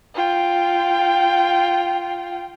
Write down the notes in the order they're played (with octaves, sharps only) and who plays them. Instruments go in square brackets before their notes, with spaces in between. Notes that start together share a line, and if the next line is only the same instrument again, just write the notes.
[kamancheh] F4 G5